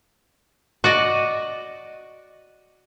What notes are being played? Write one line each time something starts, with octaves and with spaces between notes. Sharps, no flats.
F#4 D5 D#5